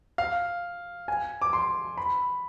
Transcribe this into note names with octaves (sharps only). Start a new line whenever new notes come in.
F5
G#5
D6
C6
B5